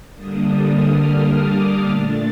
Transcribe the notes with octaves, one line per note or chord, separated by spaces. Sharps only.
D3 G3 A#3 D4 D#6
D#6
F6
D#6
D6
F6
A#2 A3 D4 A6